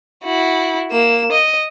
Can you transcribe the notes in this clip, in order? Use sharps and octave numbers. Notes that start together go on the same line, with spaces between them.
E4 F#4
A#3 E7
D#5